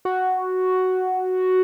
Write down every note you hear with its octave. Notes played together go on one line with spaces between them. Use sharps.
F#4